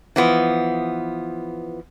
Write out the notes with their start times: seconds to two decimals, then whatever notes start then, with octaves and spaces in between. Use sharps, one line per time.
0.16 E3 F3 B3